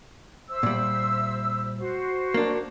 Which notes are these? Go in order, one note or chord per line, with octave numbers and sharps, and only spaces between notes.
C5 E5 E6
A#2 G3
F#4 C5
A#3 D4